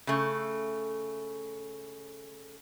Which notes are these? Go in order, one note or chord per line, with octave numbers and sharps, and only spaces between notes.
C#3 A3